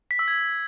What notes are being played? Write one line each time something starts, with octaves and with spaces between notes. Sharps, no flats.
B6
E6
G#6